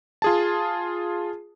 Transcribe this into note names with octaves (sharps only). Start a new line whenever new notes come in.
F4 G#4 A5